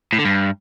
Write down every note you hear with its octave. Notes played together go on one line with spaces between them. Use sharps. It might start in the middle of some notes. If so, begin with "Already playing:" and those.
A2
D3
G2